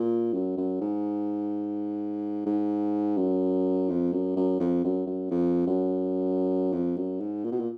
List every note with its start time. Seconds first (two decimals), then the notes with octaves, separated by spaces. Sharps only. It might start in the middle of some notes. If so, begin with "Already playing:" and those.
Already playing: A#2
0.33 F#2
0.57 F#2
0.81 G#2
2.46 G#2
3.18 F#2
3.89 F2
4.12 F#2
4.36 F#2
4.60 F2
4.84 F#2
5.07 F#2
5.31 F2
5.67 F#2
6.73 F2
6.97 F#2
7.20 G#2
7.44 A#2
7.52 B2
7.59 A#2